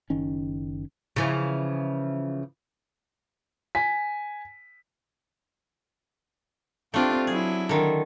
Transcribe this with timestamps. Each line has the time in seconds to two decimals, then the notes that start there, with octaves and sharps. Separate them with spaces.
0.10 F#1 D#3 C#4
1.16 C#3 E3 F3
3.75 G#5 B6
6.94 A3 C4 D4 F4 G4
7.27 F#3 E4 G#4
7.69 D3 D#3